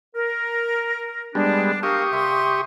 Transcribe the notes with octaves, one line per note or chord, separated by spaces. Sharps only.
A#4
G3 G#3 B3 D4
G4 A#4 F5 C#6 D#6
C3 E5 C6